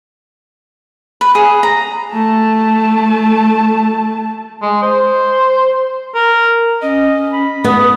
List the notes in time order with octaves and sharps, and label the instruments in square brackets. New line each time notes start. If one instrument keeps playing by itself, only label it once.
[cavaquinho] B4
G#4
A#5
[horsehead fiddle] A3 A5
[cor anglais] G#3
C5
A#4
[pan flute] C#4 [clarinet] D#5
[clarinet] B5
[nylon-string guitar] B3 [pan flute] D#6